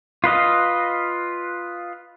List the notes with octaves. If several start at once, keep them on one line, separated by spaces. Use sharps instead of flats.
F4 B4 D#5 F5